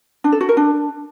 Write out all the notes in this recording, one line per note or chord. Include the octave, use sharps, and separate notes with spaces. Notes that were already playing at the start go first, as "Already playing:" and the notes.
D4
A4
F#4
A#4
D4